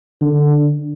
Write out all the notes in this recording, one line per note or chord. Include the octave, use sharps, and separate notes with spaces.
D3